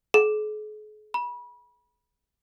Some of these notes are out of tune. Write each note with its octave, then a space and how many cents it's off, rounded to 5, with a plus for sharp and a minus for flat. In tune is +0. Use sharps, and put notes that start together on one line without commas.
G#4 +45
B5 -30